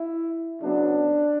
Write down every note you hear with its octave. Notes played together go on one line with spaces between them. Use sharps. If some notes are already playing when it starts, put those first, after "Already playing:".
Already playing: E4
C#3 F#3 B3 D4